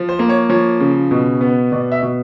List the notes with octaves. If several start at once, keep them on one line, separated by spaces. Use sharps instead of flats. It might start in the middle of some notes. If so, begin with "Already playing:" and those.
Already playing: F3
C5
A#3
C#5
F3 C#5
C#3
B2
B3
B2 D5
E5
B2